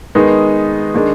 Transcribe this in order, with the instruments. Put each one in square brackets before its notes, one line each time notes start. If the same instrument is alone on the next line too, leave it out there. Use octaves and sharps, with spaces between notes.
[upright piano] D#3 G#3 B3 D#4
D#3 G#3 D4